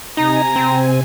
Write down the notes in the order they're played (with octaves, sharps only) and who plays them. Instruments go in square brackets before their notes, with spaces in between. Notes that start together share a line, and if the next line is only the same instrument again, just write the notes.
[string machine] C3 G#5 [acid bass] D#4 [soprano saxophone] A#5
[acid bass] C4